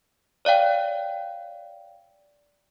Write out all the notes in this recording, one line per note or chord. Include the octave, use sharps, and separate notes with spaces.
C#5 D5 F5 G5